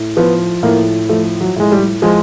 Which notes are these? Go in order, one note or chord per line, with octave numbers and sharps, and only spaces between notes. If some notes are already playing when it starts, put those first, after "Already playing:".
Already playing: A2
F3 B3
A2 A#3
F3 A3
F#3
A2 G#3
G3
F3 G#3